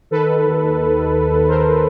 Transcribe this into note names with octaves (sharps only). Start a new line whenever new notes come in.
D#3 A4 B4
D#3
D#2
D#3
D#2
D#3
D#2
D#2
D#3 A#4 C5
D#3